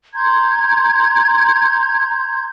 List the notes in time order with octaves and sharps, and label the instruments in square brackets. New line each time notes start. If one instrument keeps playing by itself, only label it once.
[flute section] A#5 C6 G6 G#6